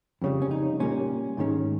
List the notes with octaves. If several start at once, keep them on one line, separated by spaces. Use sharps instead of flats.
F2 C#3 G3
C#4
D#4
A#2 G3 A#3 C#4
G#2 D#3 G#3 C#4